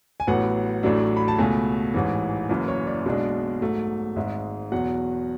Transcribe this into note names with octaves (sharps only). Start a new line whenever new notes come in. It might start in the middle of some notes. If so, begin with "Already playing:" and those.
G#5
A1 A2 F#3 B3 F#5
A1 A2 F#3 A3 D4
B5
A5
C#2 B2 A3 G#5
A1 G#2 E3
F#1 F#2 E3
C#5
D5
B1 B2 G#3 D4
G#2 F#3 A3
G#1 G#2 G#3 E5
E2 B2 F#3 F#5